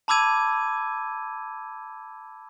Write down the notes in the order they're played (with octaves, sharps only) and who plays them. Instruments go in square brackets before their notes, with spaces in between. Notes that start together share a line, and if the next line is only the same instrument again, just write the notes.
[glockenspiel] A5 B5 D6 E6 G#6 D#7